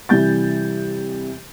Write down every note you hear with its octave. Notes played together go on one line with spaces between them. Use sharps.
C3 E3 G3 G6 A6